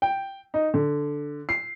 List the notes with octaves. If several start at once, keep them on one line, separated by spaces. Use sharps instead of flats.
G5
D#4
D3
C7